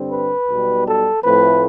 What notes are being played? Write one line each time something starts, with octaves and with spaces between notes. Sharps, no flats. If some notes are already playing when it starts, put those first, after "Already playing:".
Already playing: G2 D3 G3 C4
B4
B1 B2 G3
A4
A2 F3 A3 C4 B4